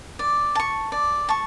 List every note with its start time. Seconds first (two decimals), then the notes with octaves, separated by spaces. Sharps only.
0.19 D5
0.55 A5 C#6
0.92 D5
1.29 A5 C#6